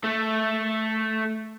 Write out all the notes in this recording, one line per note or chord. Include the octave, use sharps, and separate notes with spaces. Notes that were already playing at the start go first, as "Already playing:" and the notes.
A3